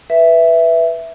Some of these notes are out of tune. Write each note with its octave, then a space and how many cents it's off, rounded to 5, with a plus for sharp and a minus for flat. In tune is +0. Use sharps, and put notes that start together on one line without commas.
B4 +0 E5 +0